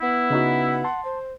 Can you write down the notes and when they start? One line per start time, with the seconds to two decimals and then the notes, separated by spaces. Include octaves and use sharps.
0.01 B3 E4 F#5
0.30 C#3 D#4 F#4
0.84 A5 C6
1.05 C5